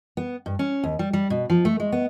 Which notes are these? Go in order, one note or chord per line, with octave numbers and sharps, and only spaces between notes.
B3
G2
C#4
D#2
G3
G3
B2
F3
A3
G#3
B3